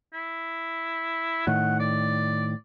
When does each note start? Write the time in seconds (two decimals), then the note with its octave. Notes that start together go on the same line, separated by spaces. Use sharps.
0.14 E4
1.47 A2 D#3 F#5
1.80 D5